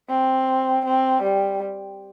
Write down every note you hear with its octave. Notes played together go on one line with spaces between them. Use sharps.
C4
C4
G3